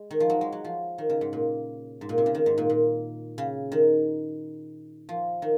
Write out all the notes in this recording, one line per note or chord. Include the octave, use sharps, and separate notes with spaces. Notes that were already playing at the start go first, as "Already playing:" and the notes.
Already playing: G#3
D#3
F3
F#3
G#3
F#3
F3
D#3
C#3
G#2
A#2
G#2
A#2
C3
C#3
D#3
G#2
A#2
A#2
C#3
D#3
F3
D#3